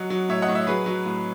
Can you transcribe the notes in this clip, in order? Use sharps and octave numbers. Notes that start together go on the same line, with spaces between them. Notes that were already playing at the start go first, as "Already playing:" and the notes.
Already playing: F#3 D#5 F#5
F#3
A2 C#5 E5
D#5 F#5
A2
C#5 E5
F#3 G#4 B4
F#3
A2